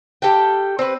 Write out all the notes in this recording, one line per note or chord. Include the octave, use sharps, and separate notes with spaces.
G4 A4 F5 G5
C4 B4